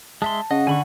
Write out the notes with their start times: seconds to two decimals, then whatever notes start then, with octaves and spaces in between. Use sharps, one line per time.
0.22 G#3 E5 A5 C6
0.51 C#3 D#5 F#5
0.67 D3 G#5 B5 C#6